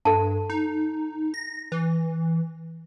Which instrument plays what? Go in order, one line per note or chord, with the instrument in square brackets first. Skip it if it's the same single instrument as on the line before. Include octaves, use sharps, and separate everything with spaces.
[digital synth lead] G2 [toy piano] A4 A5
[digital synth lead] D#4
A#6
E3